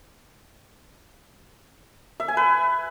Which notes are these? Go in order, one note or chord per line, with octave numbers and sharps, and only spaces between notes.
E5
G#5
B4